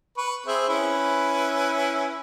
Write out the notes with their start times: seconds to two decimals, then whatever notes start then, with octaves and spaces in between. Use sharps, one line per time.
0.17 B4 C#6
0.47 C4 G#4 E5
0.69 C#4 E4 B4